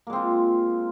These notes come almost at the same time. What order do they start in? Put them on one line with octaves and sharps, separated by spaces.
A#3 G#3 C4 F4